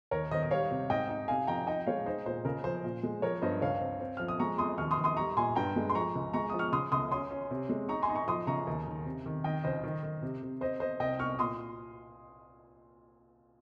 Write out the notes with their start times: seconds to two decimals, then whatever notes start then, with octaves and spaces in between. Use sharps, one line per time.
0.11 D#2 A#4 C#5
0.31 D#3 C5 D#5
0.43 D#5
0.51 G3 C#5 F5
0.71 C3
0.90 G#2 D#5 G5
1.09 D#4
1.28 C3 F5 G#5
1.47 F2 G5 A#5
1.67 D#4 D#5 G5
1.87 G#3 C#5 F5
2.06 D#4 C5
2.25 A#2 C5
2.45 C#3 A#4
2.64 F3 C5
2.84 A#2
3.03 G#3
3.22 F3 A#4 C#5
3.42 G2 C5 D#5
3.62 C#2 C#5 F5
3.81 C4
4.00 C4
4.17 F3 F6
4.28 D#6
4.39 G#3 A#5 C#6
4.58 F2 C6 D#6
4.78 D#2 C#6 F6
4.91 C6 D#6
4.97 D#2
5.04 C6 D#6
5.17 G3 A#5 C#6
5.37 A#2 G#5 C6
5.56 G2 G5 A#5
5.76 G#3
5.90 C6
5.94 F3 A#5 C#6
6.15 C#2
6.34 G#3 A#5 C#6
6.50 F3 D#6
6.59 C#6 F6
6.72 C#3 C6 D#6
6.92 C#2 C6 D#6
7.11 C#4 C6 D#6
7.31 C#4
7.50 C3
7.69 G#3
7.89 D#4 A#5 C#6
8.03 G#5 C6
8.09 D#4
8.15 A#5 C#6
8.28 F3 C6 D#6
8.47 C#3 A#5 C#6
8.67 D#2
8.87 D#3
9.06 C3
9.26 D#3
9.44 D#3 D#5 G5
9.64 C#2 C5 D#5
9.83 D#3
10.03 D#3
10.22 C3
10.42 C3
10.61 C4 C5 D#5
10.80 C4 C5 D#5
11.00 C2 D#5 G5
11.19 C2 C#6 F6
11.39 A#2 C6 D#6